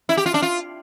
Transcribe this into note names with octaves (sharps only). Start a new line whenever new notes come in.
E4
G4
F4
D4
F4